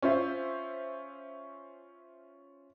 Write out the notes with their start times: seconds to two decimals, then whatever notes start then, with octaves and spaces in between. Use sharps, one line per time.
0.02 C#4 F4 C5 E5